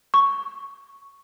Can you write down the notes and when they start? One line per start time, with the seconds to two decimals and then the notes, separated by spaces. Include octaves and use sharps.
0.14 C#6